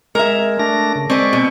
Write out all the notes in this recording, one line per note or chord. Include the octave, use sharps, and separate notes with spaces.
G#3 A#4 E5
A3 D4 A#6
C#3
G#3 C4 B4 D5 C#6
B2